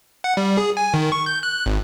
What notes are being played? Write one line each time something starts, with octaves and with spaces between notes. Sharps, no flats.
F#5
G3
G#4
G#5
D#3
C#6
G6
F#6
G#1